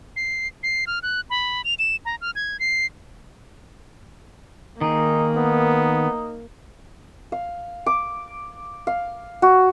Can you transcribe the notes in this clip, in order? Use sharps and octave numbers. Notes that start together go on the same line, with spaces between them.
C7
C7
F6
F#6
B5
F7
E7
A#5
F6
G#6
C7
D#3 A#3 D#4 G#4
B3 D#4
F5
D6
F5
F#4